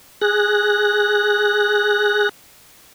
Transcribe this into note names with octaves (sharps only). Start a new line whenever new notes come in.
G#4 F#6 A#6